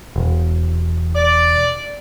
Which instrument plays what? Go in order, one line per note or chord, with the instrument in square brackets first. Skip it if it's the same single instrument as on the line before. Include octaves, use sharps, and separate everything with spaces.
[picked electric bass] E1
[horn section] D5